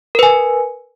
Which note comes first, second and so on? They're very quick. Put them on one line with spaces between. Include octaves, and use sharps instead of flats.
A#4 B4 G#5